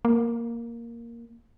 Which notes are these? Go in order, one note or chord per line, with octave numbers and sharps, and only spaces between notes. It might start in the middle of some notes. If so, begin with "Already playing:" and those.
A#3